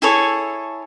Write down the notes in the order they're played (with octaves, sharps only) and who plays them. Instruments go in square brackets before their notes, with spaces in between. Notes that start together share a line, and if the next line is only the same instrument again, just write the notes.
[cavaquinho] E4 G#4 A4 C#5